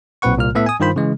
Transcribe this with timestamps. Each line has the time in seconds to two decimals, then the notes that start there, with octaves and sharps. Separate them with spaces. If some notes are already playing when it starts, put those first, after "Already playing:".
0.22 B1 A#2 C4 B4 F#5 C#6
0.37 C2 A#2 A#3 F6
0.55 A2 B3 A4 E5 F#5
0.66 G#5 D#6
0.80 G2 D#3 F4 C5 B5
0.96 C#3 E3 G#3